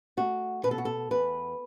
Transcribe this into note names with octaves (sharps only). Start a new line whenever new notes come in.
A3 F#4
B2 B4
A4
F#4
A4
E2 B4